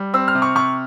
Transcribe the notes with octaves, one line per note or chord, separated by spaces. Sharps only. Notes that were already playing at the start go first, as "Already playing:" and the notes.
Already playing: G3
C4 E6
F6
C3
C#6
C3 C#6